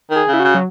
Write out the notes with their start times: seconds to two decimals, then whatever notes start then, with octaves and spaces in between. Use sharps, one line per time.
0.10 D#3
0.16 G#4
0.28 C#3
0.34 E4
0.40 F#4
0.45 C#3
0.55 F#3